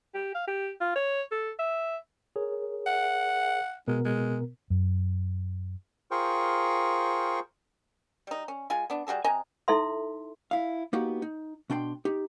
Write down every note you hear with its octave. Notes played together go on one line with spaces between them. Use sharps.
G4
F5
G4
F4
C#5
A4
E5
G#4 A#4 C#5
F#5
B2 G#3 B3 A#4
G#3
F#2
F4 G#4 A#4 C5 G5 C#6
G3 D#4
C#4
G#3 F4 G#5
B3 D4
G3 F#4 G#4 A4
C3 D#5 G#5 A#5
D#4 E4 A4 E5 C6
E4 F5
A#3 B3 D#4 F#4 G4
D#4
B2 D4 G5 C6
D#4 G4